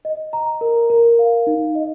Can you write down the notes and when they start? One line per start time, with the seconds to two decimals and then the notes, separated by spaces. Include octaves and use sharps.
0.05 D#5
0.33 A#5
0.61 A#4
0.90 A#4
1.19 F5
1.47 D#4
1.75 D#5